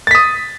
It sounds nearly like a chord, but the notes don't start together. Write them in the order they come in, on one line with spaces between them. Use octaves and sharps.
A6 B6 D#6